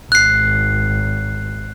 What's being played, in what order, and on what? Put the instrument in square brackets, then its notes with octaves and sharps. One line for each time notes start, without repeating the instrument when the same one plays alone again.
[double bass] G#1 [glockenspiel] F#6 C7